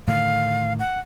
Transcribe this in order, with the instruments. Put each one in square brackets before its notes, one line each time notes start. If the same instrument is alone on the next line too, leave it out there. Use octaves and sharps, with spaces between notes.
[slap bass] A2 D3 D#3 [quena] F5
[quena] F#5